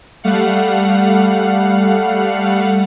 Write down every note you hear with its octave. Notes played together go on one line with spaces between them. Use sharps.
G3 A3 F5 F#5